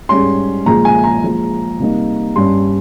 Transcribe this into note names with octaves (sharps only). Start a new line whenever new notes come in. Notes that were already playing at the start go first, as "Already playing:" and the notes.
G#2 G3 C#4 C6
A#2 F3 G#3 A#5
G#5
A#5
A#2 F3 G#3
C3 G3 A#3 D#4
G2 G3 C#4 C6